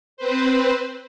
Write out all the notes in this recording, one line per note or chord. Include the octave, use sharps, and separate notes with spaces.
C4 B4 C5